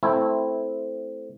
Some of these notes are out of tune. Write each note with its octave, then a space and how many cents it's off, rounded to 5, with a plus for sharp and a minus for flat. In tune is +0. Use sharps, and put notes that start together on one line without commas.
A3 +0 C4 +0 E4 -10